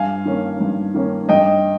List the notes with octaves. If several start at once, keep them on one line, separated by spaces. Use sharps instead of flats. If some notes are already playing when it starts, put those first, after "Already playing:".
Already playing: G2 F5 G#5
D#3 A#3 C#4
G2
D#3 A#3 C#4
G2 D#5 G5